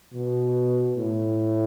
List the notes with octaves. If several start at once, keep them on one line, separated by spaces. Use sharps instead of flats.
B2
A2